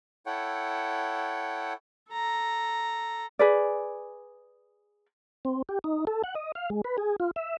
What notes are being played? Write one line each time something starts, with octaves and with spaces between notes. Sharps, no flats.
E4 A4 C#5 F#5 G5
A4 A#5
G#4 B4 D5
C4
G4
D#4
A4
F#5
D#5
F5
G#3
B4
G#4
F4
E5